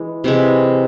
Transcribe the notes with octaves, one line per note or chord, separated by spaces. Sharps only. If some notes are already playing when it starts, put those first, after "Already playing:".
Already playing: E3 G#3
C3 E3 G#3